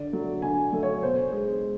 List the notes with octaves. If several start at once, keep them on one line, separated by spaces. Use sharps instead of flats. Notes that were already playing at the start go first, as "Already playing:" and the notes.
Already playing: D3 D5
F#3 A3
D3 G#5
F#3 A3
C#5
B2 C5
G#3